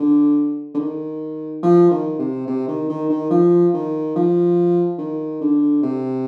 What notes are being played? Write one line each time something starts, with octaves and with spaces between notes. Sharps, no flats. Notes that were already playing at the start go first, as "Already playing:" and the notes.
Already playing: D3
D3
D#3
F3
D#3
C3
C3
D#3
D#3
D#3
F3
D#3
F3
D#3
D3
C3